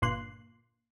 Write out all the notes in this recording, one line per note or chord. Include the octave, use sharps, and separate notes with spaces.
G1 A#2 C6 F#6